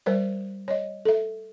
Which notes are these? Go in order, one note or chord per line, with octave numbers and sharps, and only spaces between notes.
G3 A#4 C5 D5
C#5 D#5
A4 E5